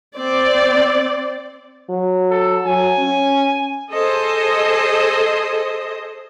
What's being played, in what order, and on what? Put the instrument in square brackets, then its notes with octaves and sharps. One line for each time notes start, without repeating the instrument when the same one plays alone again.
[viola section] C4 D5
[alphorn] F#3
[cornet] A4
[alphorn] F#3 [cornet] G#5
[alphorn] C#4
[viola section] G#4 A4 C5 D#5